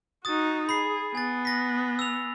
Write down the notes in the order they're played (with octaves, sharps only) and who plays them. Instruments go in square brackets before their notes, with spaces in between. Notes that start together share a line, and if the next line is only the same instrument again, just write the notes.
[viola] D#4 F#4 [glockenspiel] D#6 A6
[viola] G#4 [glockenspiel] B5 C7
[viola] B3 [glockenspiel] G#5 A6
[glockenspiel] A#6 B6
E6 F7